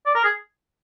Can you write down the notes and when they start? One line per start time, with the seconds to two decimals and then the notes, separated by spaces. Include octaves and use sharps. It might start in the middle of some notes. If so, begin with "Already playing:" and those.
0.06 D5
0.15 A#4
0.24 G#4